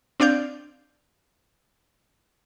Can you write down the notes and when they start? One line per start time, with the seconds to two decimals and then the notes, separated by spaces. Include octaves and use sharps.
0.20 C4 D4 D5 F5 G6